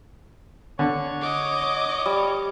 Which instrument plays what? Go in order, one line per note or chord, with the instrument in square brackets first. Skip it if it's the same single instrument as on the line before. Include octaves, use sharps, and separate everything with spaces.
[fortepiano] D3 [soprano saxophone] C#5
[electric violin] D#5 D6
[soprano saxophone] C#5
[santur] G3